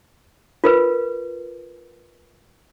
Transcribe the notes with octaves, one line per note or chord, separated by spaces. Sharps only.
F4 A#4 B4